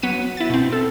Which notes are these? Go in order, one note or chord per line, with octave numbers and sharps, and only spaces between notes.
F#3 B3 B6 D#7
E4 A6
B2 C4
A4